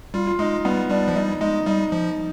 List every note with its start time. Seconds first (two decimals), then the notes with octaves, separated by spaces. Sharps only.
0.14 G3 F4
0.27 F4
0.39 G#3 D#4
0.65 G3 B3
0.90 G3 D4
1.08 F3
1.15 G3 D#4
1.41 G#3 D#4
1.66 G3 D#4
1.92 F3